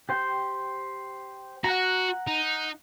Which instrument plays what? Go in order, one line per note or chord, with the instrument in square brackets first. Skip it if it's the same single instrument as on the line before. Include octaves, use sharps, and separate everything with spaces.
[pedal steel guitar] G4 C5 G5
[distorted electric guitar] F#4 [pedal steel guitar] F#5 A#5
[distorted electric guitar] D#4